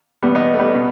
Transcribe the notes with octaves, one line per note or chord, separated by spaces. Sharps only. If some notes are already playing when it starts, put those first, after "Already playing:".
E2 B2 G3 B3
B3 D#4
A3
G3 B3
B2